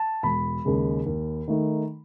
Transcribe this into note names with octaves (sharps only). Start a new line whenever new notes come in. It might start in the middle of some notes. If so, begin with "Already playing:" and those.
Already playing: A5
E1 B5
D#2 C#3 G#3
D#2
D#3 A3 D#4